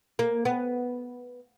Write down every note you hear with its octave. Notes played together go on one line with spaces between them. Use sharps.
A#3
B3